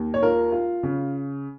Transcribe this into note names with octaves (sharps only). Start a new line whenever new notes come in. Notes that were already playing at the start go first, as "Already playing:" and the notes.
Already playing: D#2
C#5
F4 A#4
F4
C#3